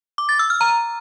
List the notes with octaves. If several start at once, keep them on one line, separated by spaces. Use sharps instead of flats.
D6
A6
E6
F6
A#5